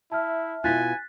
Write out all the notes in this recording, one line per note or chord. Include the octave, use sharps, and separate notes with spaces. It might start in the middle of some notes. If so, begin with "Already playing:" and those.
E4 E5 A5 F6
B2 E4 F4 G#5 F#6 A6 B6